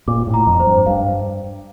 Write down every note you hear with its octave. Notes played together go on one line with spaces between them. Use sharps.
A#2 D6
A2
A#5
F2
C5
G2
G2 F5